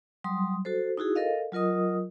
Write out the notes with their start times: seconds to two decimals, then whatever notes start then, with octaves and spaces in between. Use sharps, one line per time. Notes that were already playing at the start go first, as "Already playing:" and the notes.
0.24 F#3 G3 C6 D#6
0.65 F#4 A4 C5
0.97 D#4 E4 F#4 G#4
1.16 A4 A#4 D#5 F5
1.52 F#3 F4 A#4 D#5 D#6